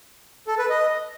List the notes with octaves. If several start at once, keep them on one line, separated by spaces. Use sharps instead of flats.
A4
B4
D#5